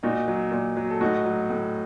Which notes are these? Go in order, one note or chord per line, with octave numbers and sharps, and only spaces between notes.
A#2 D#4 F#4
F#3
A#2
F#3
A4
A2 D#4 F#4
F#3
A2